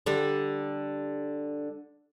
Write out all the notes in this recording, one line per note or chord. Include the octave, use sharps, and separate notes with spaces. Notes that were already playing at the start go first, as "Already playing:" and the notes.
D3 G3